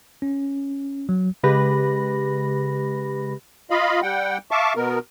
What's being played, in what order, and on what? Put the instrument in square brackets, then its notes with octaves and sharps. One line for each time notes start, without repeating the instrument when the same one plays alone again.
[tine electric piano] C#4
F#3
[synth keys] C#3 G#3 G4 B4 B5 A#6
[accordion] F4 D#5 F5 B5
G3 F#5 G5
E5 F5 A5 C#6 D6
B2 B3 A#4